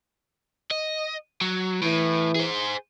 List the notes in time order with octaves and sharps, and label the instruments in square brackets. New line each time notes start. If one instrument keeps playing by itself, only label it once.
[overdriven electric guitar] D#5
F#3
[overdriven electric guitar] A2 [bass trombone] E3
[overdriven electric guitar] G#4 C5